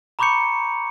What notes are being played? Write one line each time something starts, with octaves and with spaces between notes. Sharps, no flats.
A#5 B5 C#6 D6 G6 C#7